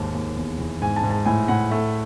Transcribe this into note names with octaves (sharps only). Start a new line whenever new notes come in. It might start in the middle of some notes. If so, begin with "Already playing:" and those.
Already playing: D#2 G#2 A5
D#2
E2
E2
G#2 G#5
A5
G#2
A5
A2 G#5
A2 F#5
A3